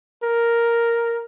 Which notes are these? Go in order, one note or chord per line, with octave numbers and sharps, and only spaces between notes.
A#4